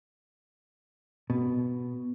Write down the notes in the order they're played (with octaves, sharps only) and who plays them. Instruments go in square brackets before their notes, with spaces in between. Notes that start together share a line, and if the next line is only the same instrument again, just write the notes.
[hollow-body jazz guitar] B2